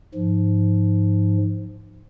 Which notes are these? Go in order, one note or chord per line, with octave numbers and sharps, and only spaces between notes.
G#2 F3